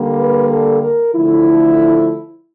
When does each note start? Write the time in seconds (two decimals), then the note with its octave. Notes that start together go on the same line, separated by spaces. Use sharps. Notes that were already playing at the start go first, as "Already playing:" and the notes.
Already playing: D3 G3 A#3
0.19 B4
0.51 A4
0.83 A#4
1.14 D3 F3 A3 E4